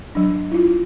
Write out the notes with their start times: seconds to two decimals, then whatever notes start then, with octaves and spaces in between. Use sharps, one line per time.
0.15 F#3 D4
0.52 E4 F4